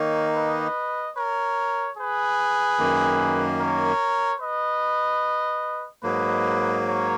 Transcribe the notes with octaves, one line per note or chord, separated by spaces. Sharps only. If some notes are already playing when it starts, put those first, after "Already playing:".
Already playing: D#3 A#3 D#4 A#4 C#5
B4 D#5
A#4 C#5
G#4 B4
F#2 D#3 A#3
A#4 C#5
B4 D#5
G#2 F#3 A#3 B4 D#5
A#4 C#5